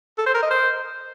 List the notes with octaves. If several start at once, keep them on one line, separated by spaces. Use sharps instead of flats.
A4
C5
A#4
D#5
C5